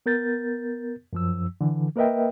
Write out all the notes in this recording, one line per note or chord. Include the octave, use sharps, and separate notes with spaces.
B3 A#4 G6 A6
F#2 F3 E6
D3 E3
A#3 A#4 B4 D#5 E5 G5